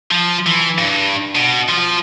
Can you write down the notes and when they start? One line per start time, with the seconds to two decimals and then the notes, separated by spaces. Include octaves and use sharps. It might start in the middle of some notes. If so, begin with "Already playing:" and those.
0.11 F3
0.47 E3
0.78 G2
1.35 B2
1.68 F3